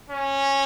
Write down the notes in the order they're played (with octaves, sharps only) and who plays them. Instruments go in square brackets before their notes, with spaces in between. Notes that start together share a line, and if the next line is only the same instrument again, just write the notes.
[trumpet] C#4